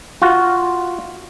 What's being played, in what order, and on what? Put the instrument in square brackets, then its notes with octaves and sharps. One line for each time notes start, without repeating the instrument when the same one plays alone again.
[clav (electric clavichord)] F4 F#4